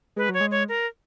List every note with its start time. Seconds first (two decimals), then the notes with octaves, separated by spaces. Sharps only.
0.16 G#3 B4
0.29 F#3 C#5
0.41 G#3
0.51 C#5
0.69 A#4